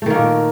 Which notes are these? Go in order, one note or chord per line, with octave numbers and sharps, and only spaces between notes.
A#2 D#3 A3 A#3